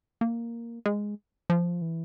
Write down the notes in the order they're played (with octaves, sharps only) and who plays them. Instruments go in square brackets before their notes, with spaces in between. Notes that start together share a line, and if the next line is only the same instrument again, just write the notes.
[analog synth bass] A#3
G#3
F3
E3